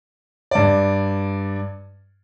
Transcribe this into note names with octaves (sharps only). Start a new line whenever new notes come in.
G2 D5